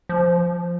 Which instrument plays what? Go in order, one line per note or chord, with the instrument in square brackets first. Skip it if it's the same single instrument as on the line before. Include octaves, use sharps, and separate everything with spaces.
[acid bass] F3